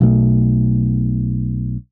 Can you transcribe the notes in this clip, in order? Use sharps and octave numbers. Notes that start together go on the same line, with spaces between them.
B1 B2 A3